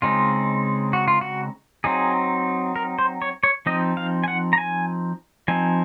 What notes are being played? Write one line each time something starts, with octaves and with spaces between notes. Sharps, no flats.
C#3 G#3 C4 D#4 F4
F#4
F4
F#4
F#3 C4 D#4 G#4
A#4
C5
C#5
C#5
F3 C4 D#4 D#5
F5
G#5
F#5
A#5
G#5
F3 C4 D#4 G#5